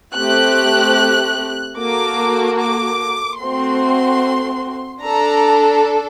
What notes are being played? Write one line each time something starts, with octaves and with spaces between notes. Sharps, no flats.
A3 C4 G4 F#6
A#3 F#4 A4 D6
D6
A3 C4 F#4 C6
D4 A4 A#5